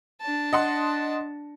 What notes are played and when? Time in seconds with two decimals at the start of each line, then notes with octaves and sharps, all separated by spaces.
0.21 D4 A5
0.53 D#5 F#5 C6